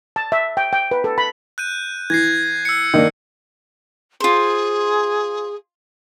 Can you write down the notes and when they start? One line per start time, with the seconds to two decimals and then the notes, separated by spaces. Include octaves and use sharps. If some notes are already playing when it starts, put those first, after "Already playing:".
0.16 A5
0.32 E5
0.57 G5
0.73 G5
0.91 B4
1.04 A4
1.18 B5
1.58 F#6 G6 D#7
2.10 E3 G#6 A#6 C7
2.65 E6 C#7
2.94 D#3 A#3 D4
4.20 F4 G#4 C5